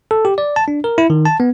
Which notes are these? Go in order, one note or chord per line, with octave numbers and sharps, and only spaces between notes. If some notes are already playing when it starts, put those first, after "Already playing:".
A4
G4
D5
A5
D4
A#4
E4
D#3
A5
B3